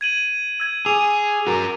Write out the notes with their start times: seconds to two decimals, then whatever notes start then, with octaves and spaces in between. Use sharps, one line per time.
0.01 G#6 D#7 F#7
0.60 E6 G#6 F#7
0.86 G#4 D6 E6 F7
1.47 F#4 A#4